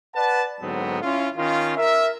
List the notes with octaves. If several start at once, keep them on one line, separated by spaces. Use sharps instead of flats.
B4 D5 F#5 A5
G#2 D3 F#3 B3 C4
C#4 E4 F4
D#3 C#4 F4
A#4 E5